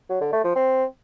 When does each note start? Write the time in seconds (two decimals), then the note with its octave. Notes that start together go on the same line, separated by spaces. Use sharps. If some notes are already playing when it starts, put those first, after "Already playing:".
0.09 F#3
0.21 D3
0.32 A3
0.44 F3
0.56 C4